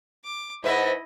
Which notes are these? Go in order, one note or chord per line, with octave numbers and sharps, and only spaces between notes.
D6
G#2 E4 B4 D#5 E5